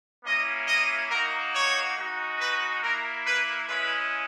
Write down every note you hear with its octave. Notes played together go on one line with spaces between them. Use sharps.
A#3 C#4 E4 D#5
D#5
A#3 D#4 F#4 A#4
C#5
G#3 D#4 F#4
B4
A#3 E4 A#4
B4
G#3 C#4 E4 B4